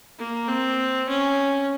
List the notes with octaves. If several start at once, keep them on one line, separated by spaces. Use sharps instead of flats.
A#3
C4
C#4